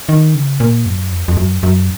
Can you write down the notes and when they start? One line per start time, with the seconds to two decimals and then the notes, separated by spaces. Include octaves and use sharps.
0.09 D#3
0.35 C#3
0.60 A#2
0.86 F#2
1.12 F2
1.28 F2
1.37 F#2
1.63 F#2